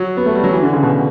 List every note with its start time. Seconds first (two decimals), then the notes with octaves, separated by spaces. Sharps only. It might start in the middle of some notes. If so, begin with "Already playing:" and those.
Already playing: F#3
0.17 B3
0.26 A3
0.35 G3
0.44 F#3
0.52 E3
0.63 D3
0.73 C#3
0.83 B2